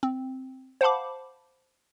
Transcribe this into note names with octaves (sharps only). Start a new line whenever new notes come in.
C4
C5 F5 F#5 A5 B5 D6